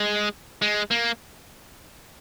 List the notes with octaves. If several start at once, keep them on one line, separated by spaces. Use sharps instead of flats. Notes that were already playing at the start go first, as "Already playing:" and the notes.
Already playing: G#3
G#3
A#3